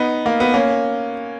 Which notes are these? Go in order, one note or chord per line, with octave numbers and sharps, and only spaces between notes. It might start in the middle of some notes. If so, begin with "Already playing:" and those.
Already playing: B3 D#4
A#3
B3
A#3 C#4